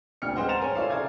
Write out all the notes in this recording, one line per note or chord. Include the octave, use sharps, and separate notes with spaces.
D#1 D2 D4 G5 F6 C#7
G#3 C4 B4 C5 D#5 F#5
A#5 A6 E7 F7
A#4 C5 C#5 G#5
F4 A4 C#5 D5 E5 F5
C#3 A4 D5 F5 A#5 G#6